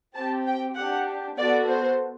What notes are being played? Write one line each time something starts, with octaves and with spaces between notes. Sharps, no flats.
C4 G4 A5
G5
D4 G4 F#5
B3 F#4 A4 D5
C5